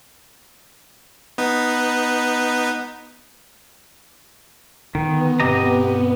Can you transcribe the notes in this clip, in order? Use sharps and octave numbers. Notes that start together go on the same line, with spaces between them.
B3 D#4 B4
D3 D#3 B3
G2 B2 C4 G4 D#5 A#5